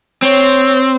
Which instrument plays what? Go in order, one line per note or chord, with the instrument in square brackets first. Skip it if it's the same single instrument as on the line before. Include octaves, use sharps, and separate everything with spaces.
[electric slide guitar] C4 [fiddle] C#5